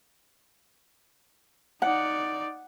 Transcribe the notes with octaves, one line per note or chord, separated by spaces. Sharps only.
D#4 D5 F#5